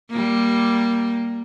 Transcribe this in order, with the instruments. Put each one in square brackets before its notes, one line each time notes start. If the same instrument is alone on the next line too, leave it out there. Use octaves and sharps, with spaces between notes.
[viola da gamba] G3 A#3